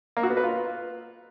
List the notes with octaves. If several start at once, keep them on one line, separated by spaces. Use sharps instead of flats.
A#3
F#4
B3
B4
F4